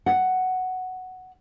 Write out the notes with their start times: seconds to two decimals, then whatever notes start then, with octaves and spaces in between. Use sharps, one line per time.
0.06 F#5